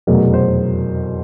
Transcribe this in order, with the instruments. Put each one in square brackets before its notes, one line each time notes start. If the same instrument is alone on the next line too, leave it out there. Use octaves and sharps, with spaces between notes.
[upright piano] F1 E2 B2 F#3 A#4
C5